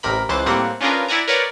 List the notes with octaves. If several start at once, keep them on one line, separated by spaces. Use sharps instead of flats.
A1 C3 A#4 B5
C#2 E3 C5 F#6 A6
A2 G3 A#3 C4 F#5
C#4 D4 F4 G#4 A#4 B4
E4 D5 F#5 G#5 A#5
A#4 B4 C#5 D5 F#5